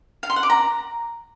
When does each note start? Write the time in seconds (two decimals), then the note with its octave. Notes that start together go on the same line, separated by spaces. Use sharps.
0.23 F5
0.30 C6
0.36 F#5
0.43 D6
0.50 A#5